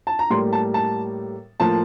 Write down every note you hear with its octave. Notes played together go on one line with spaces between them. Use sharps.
A5
A#5
A2 G3 A#3 C6
A5
A5
A2 F3 A#3 A5